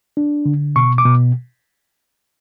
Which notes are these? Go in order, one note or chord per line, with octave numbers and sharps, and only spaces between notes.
D4
D3
B2 C#6
D6
B2